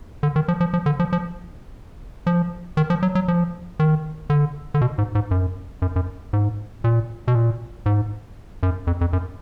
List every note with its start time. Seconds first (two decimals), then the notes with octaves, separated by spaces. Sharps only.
0.23 D3
0.36 D#3
0.48 F3
0.61 F3
0.74 F3
0.86 D3
1.00 F3
1.13 F3
2.27 F3
2.77 D#3
2.90 F3
3.03 F#3
3.15 F#3
3.28 F3
3.80 D#3
4.30 D3
4.74 D3
4.81 B2
4.98 G#2
5.15 G#2
5.31 F#2
5.82 F#2
5.96 F#2
6.33 G#2
6.84 A#2
7.28 B2
7.35 A#2
7.86 G#2
8.63 F#2
8.87 F2
9.01 F2
9.13 F#2